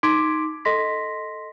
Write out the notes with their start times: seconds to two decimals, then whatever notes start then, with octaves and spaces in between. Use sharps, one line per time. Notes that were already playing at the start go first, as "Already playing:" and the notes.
0.03 D#4 C6 D6 G#6 B6 D7
0.65 A4 D#5 C6 A#6 B6